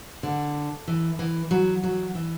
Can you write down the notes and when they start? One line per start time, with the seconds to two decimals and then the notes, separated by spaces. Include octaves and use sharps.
0.23 D3
0.88 E3
1.19 E3
1.51 F#3
1.83 F#3
2.15 E3